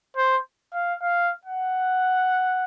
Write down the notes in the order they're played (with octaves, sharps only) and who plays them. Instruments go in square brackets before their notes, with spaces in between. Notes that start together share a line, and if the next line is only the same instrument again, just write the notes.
[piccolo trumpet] C5
F5
F5
F#5